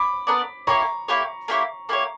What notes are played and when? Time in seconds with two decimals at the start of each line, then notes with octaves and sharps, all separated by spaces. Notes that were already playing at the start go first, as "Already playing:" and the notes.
Already playing: B5 D6
0.27 B3 D4 A#4 D5
0.67 A#3 E4 G4 C#5 A#5 C#6
1.08 A#3 E4 G4 C#5
1.48 A#3 E4 G4 C#5
1.89 A#3 E4 G4 C#5